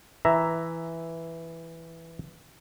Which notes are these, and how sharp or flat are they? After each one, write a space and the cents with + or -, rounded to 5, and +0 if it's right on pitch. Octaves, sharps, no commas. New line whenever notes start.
E3 +0 E5 +0 A#5 +0